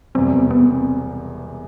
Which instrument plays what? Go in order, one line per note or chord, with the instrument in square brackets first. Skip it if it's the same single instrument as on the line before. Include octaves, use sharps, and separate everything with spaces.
[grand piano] E1 E2 C3 G3 [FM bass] C4
[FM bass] B3
B3
C4